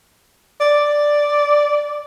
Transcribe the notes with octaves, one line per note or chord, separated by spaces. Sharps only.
D5